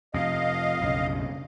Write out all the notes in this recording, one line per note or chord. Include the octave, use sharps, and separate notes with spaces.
F2 C3 D#5 F5
B1 F#2 C#3